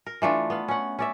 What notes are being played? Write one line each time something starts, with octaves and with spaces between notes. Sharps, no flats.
A#4
E3 A3 D4 F4
B3 F5
C#4 F#5
C#4 D5 E5